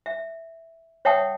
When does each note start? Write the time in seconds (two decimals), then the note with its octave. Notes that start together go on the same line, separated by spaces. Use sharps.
0.06 E5
1.05 C#5 E5 F#5 G5 A5 D#6